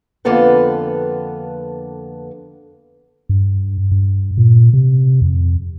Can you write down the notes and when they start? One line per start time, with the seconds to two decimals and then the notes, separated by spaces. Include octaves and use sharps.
0.25 F2 D3 A#3 B3 A4 B4
3.29 G2
3.91 G2
4.38 A#2
4.73 C3
5.22 F2